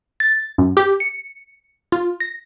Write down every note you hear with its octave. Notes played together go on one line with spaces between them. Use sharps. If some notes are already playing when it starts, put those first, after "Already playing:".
A6
F#2
G4
C#7
F4
A#6